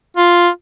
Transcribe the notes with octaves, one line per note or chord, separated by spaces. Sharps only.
F4